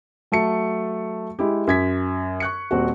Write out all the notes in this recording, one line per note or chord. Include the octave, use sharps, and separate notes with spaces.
F#3 A3 A5 C#7
G#3 E4 G4
F#2 G#6 B6
C#6 F#6 C#7
D#1 C4 F#4